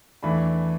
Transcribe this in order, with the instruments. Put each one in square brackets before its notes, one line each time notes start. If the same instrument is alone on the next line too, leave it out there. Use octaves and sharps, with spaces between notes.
[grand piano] E2 E3 A3 D4 B5